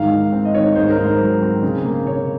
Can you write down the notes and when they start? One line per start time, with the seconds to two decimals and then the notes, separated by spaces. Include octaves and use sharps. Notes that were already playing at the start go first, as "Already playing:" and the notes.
Already playing: G#2 D#3 F5
0.11 D#3
0.33 C4
0.45 D#5
0.54 D#3 C#5
0.75 G#2 C5
0.90 A#4
0.97 G#2
1.03 C5
1.19 F#3
1.42 C4
1.63 C#3
1.84 A#3
2.06 C#3 C#5